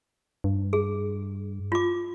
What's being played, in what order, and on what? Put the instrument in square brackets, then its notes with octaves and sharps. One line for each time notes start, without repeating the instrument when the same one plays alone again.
[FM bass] G2
[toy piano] G#4
F4 D6